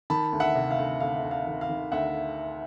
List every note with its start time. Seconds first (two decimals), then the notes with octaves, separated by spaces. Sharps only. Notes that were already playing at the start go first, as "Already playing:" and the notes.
0.10 D#3 A5 B5
0.32 D2
0.40 E5 F#5
0.55 C3
0.71 F5
0.78 D2
1.00 D2 F5
1.24 D2
1.31 F5
1.46 D#3
1.61 F5
1.69 D#3
1.92 D2 E5 F#5